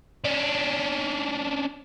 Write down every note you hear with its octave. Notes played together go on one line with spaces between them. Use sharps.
C#4 D4